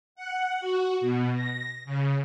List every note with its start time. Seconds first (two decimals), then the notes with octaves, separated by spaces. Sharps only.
0.15 F#5
0.60 F#4
1.01 B2
1.34 A#6
1.85 C#3